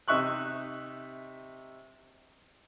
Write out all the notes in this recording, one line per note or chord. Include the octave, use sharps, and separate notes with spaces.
C3 D#4 E5 C#6 F#6